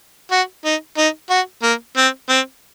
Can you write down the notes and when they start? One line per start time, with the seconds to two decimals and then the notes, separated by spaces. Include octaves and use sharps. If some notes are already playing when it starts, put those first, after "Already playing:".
0.31 F#4
0.65 D#4
0.98 D#4
1.30 F#4
1.63 A#3
1.97 C4
2.29 C4